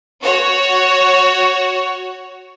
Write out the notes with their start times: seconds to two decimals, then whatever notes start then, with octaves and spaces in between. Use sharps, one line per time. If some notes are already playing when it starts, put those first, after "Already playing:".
0.22 F#4 C#5